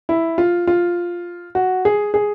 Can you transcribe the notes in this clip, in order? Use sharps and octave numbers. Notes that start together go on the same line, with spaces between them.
E4
F4
F4
F#4
G#4
G#4